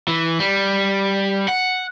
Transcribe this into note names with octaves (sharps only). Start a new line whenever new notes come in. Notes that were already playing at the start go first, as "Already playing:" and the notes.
E3
G3
F#5